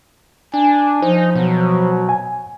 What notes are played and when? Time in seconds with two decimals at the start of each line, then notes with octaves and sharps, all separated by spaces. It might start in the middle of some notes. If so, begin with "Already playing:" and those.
0.54 D4 G#5
1.02 F3 D#4 C5
1.35 B2 F#3
2.09 G#5